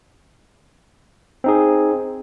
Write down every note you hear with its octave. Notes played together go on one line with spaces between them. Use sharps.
C4 D#4 G#4